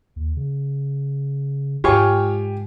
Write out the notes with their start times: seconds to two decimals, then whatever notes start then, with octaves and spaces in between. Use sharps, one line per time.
0.16 D#2
0.37 C#3
1.84 G#2 G#3 F4 G4 C#5 G5 G#5 C#6